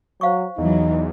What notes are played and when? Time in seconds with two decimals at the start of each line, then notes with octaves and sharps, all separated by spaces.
0.21 F#3 C5 F5 C#6
0.58 E2 E3 F#3 D#4